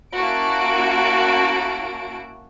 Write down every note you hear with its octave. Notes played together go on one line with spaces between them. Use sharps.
A#3 C#4 E4 F#4 A5 D7